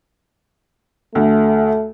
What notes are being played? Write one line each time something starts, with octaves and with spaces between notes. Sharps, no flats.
D2 A3